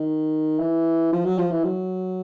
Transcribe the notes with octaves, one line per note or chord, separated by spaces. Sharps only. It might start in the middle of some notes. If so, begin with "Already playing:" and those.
Already playing: D#3
E3
F3
F#3
F3
E3
F#3